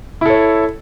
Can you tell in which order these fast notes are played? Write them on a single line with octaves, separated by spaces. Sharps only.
E4 A4 C#5